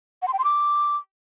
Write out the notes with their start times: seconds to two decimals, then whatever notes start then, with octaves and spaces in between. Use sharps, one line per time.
0.22 F#5
0.28 C6
0.33 G5
0.39 C6
0.44 D6